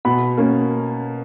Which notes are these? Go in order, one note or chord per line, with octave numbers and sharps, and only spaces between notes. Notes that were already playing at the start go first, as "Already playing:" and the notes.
B2 B5
A#3 C#4